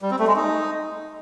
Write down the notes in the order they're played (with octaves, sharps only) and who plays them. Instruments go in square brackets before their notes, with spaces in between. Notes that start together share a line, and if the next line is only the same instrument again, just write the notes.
[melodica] G3
C4
A3
G#3
D#4